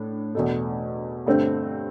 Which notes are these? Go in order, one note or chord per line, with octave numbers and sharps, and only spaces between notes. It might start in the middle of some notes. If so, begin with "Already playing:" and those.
Already playing: A2 D4
E2 B2 A3
G2 D3 A3 C4